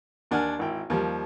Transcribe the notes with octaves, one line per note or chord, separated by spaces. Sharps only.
D#2 D4 F#5 G#5 F6
G#1 E4 G5
D#2 F3 G3